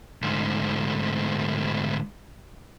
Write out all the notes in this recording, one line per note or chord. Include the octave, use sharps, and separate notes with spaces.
D2 G#2